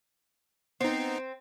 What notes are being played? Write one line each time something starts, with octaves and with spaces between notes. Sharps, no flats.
B3 C4 D#4